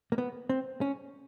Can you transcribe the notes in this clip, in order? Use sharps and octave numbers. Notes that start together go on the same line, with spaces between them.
A#3
B3
C4
C#4